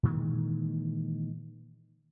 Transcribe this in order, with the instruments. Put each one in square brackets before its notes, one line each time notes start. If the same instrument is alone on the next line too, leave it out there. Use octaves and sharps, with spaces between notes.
[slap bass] A#2 D#3 E3 G#3